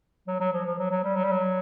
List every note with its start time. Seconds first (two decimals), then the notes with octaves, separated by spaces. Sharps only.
0.28 F#3
0.40 F#3
0.53 F3
0.66 F3
0.79 F#3
0.91 F#3
1.04 G3
1.16 F#3
1.24 G3
1.31 F#3